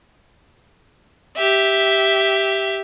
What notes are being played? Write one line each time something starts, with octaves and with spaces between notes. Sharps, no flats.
G4 E5